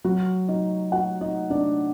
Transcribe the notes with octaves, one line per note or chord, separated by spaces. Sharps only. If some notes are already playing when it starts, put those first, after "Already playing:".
F#3 F#4
D#4 D#5
F#4 F#5
D#4 D#5
D4 D5